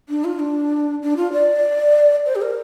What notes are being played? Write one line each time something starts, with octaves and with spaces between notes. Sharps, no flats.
D4
F4
D4
D4
F4
D5
C5
G4
A#4